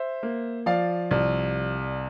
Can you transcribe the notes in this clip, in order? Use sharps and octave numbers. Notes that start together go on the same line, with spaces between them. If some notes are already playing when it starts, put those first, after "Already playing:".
Already playing: C5 E5
A#3
F3 D5 F5
C2